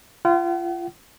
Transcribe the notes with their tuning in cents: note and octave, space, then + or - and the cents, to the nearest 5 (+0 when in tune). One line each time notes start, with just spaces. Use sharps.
F4 -30 F#5 +40